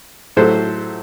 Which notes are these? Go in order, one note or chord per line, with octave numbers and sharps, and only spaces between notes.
A2 F#3 A3 A4 C5